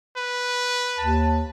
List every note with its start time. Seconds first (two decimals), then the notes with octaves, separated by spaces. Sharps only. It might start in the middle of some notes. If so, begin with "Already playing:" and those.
0.17 B4
0.98 D#2 A5